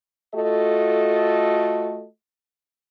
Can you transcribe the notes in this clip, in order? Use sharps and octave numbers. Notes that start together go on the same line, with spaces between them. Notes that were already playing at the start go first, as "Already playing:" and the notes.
A3 F4 F#4 A4 D#5